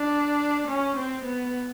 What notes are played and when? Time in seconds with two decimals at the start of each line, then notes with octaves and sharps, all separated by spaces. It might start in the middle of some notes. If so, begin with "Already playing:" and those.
Already playing: D4
0.68 C#4
0.97 C4
1.25 B3